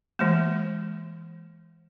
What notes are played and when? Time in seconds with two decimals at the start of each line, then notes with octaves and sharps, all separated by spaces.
0.19 E3 G#3 A#3